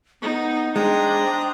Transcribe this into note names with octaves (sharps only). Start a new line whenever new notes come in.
B3 D#4
G#3 D4 C5 G5 A#5 D#6